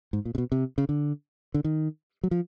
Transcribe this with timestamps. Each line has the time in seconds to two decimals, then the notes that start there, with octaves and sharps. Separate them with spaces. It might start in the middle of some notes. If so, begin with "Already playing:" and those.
0.13 G#2
0.25 A#2
0.35 C3
0.38 B2
0.52 C3
0.78 C#3
0.89 D3
1.54 D3
1.64 D#3
2.23 F#3
2.31 F3